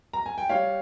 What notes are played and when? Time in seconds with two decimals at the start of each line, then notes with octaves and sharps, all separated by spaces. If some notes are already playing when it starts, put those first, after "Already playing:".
0.13 A#5
0.26 G#5
0.38 G5
0.49 G3 C#5 F5